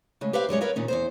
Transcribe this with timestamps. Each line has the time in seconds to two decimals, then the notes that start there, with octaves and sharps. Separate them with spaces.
0.21 C#3 G#3 A3
0.33 G4 B4 C5 E5 F5
0.49 F#2 G3 G#3 C#5
0.61 A#4 B4 C#5 D#5 F5
0.76 D#2 A#2 D#3 C#4
0.88 E2 G2 C5